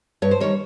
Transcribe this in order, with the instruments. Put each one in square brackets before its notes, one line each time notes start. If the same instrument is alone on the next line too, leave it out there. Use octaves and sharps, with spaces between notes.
[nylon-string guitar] G2 C#5
C5
D#3 G3 C#5